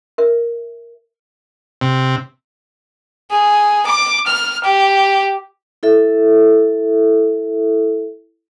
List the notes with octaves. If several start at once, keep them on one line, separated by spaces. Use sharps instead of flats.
A#4 E5
C3
G#4
D6
F6
G4
E4 A4 E5